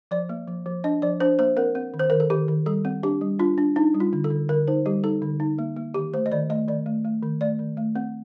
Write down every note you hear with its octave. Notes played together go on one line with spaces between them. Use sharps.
F3 D5
A#3
F3
F3
D4 D#5
F3 D5
D4 C5
A#3 C5
C4 A#4
C4
D#3
C5
D#3 A#4
A4
D#3 G4
D#3
G3 A4
C4
D4 G4
G3
D4 F4
D4
D4 D#4
G3
F4
D3
A4
D3
D3 A#4
D#4 C5
G3 G4
D#4 A4
D3
D#4
A#3
A#3
D#3 G4
A3 C5
D#5
D#3 D5
A3 D#5
D#3 D5
A3
A3
D#3
A3 D5
D#3
A3
C4